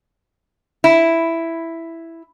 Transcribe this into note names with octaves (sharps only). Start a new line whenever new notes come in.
E4